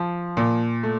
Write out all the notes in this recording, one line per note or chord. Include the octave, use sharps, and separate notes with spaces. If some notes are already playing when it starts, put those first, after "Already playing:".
Already playing: F3
A#2
A3